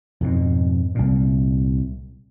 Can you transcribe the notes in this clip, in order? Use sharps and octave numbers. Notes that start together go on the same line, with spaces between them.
F2 G#2 B2
C2 A#2